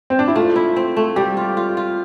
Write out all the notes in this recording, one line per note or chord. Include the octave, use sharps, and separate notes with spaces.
C4
D4
E4
A3 F4
E4
C4
A3
G3 G4
F4
F4
F4